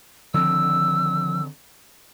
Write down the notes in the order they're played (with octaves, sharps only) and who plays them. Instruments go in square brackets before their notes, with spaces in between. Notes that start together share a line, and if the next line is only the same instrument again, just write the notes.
[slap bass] D3 D#3 C4 [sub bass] F3 [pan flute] E6